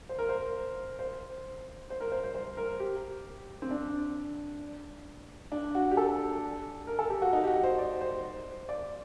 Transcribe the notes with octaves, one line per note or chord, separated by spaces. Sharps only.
C5
A#4
C5
C5
C5
A#4
C5
C5
C5
A#4
G4
C4
D4
D4
F#4
G4
A4
A#4
A4
G4
F#4
D#4
G4
F#4
C5
D5
C5
D5